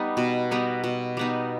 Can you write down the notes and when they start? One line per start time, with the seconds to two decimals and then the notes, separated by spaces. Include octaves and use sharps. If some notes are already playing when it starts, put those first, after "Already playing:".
Already playing: G3 B3 D#4
0.17 B2
0.51 G3 B3 D#4
0.84 B2
1.17 G3 B3 D#4